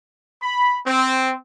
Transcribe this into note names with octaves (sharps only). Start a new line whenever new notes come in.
B5
C4